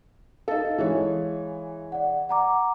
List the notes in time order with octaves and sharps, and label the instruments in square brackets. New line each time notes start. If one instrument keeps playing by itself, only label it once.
[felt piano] D#4 A4 [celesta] F5
[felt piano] E3 G#3 C#5
[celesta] D5 F#5
F#5 A#5 D6